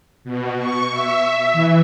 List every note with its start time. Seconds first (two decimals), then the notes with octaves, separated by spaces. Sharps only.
0.24 B2
0.58 C#6
0.91 E5
1.53 E3